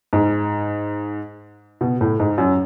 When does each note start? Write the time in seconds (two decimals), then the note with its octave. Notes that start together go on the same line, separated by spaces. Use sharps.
0.13 G#2
1.81 B2
2.01 A2
2.20 G#2
2.38 F#2